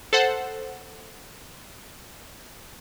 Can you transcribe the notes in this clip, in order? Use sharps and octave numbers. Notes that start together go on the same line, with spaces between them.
A4 C5 F#5